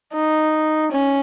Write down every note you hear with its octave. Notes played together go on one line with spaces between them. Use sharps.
D#4
C#4